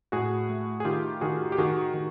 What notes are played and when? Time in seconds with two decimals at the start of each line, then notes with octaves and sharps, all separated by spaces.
0.12 A2 F#4 G#4
0.49 A3
0.80 G#4
0.85 D#3 F4 G4
1.21 D#3 F#4 G#4
1.52 G4
1.58 D#3 F#4 G#4
1.94 D#3